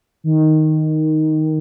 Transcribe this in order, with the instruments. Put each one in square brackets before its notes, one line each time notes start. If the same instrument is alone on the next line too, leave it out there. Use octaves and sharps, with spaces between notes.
[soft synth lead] D#3